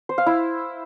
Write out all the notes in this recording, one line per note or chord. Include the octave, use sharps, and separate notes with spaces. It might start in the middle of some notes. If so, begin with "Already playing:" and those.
C5
F5
E4